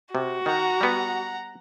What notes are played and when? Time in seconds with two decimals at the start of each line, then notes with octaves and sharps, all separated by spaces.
0.15 C3 F#4
0.46 D#3 F#5 A#5
0.81 G3 B3